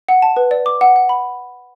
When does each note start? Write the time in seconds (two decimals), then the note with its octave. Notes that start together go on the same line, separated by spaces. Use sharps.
0.09 F#5
0.22 A5
0.37 B4
0.51 D5
0.66 D6
0.81 F#5
0.96 F#5
1.09 B5